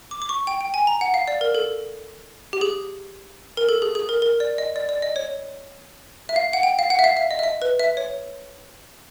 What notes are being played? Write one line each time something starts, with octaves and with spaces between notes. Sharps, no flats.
D6
D6
C#6
G5
G5
G#5
A#5
F#5
F5
D5
A#4
A4
G4
G#4
A#4
A4
G#4
G#4
A#4
A#4
D5
D#5
D5
D5
D#5
C#5
E5
F5
F#5
G5
F5
F#5
E5
F5
E5
D#5
E5
D#5
B4
E5
C#5